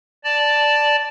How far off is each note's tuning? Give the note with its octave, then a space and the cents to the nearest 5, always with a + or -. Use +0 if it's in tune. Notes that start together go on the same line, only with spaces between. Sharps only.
D5 +0 A5 +0